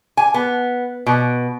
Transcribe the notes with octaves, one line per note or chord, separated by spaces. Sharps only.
G#5
B3
B2